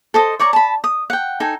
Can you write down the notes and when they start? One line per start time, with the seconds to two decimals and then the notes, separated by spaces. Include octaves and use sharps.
0.14 A4 C5 D#5
0.39 C#5 D5 A#5 C#6
0.53 A5 B5
0.84 D#6
1.10 F#5 G5
1.40 D#4 A4 G5 G#5